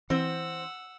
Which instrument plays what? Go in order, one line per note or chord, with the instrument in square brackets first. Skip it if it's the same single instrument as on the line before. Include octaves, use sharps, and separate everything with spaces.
[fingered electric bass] E3 [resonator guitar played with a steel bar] C4 C5 [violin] F#5 E6